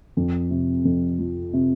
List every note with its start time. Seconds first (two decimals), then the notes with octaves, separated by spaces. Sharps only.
0.17 F2
0.51 C3
0.85 F2
1.19 F3
1.53 C3